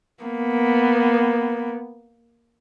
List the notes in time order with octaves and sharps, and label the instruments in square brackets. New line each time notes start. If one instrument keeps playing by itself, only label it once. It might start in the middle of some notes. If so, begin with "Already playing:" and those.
[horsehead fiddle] A#3 B3